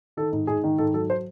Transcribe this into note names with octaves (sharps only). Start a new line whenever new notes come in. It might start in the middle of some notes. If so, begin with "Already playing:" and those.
D#3 A4
G#2
G#2 G#4
D#3
G#2 A4
F#3 A4
C5